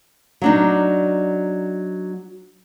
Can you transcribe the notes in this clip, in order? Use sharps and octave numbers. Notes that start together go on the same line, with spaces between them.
F#3 D4 D#4